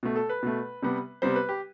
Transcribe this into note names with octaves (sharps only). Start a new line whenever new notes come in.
B2 A3
A4
B4
B2 A3
C3 G3 B3
C3 G3 B3 C5
B4
G4